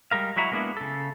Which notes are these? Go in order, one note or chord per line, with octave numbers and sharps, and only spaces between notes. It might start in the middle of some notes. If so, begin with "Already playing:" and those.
G3 G#3 A#4 F5
F#3 G#3 E4 F#4 A#5
G#3 A#3 B3 D4 E4
C#3 A4